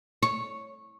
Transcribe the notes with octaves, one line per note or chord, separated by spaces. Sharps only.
C#5